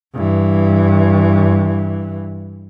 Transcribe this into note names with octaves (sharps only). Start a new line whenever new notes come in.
G2 E3